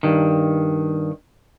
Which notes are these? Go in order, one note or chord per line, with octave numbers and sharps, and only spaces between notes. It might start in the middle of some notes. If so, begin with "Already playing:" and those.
G2 D#3